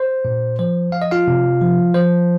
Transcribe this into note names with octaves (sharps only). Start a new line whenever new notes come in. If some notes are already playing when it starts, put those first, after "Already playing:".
Already playing: C5
A#2
F3 C5
F3 F5
D#5
F4 F5
C3
F3
F3 C5